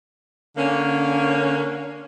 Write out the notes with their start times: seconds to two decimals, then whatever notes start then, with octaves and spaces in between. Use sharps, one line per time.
0.58 D3 A#3 C#4